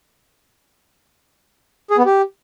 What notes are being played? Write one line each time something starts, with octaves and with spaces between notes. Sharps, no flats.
G#4
B3
G4